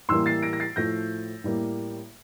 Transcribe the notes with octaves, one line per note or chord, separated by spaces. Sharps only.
A2 E3 G3 A#3 C6 E6
A6 C7
A#6 D7
A#6
A6 C7
A2 F3 A3 G6 A#6
A2 G3 A#3